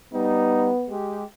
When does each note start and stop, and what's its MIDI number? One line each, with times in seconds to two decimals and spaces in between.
0.14 0.70 55
0.14 0.91 59
0.14 0.70 63
0.89 1.24 56
0.89 1.24 67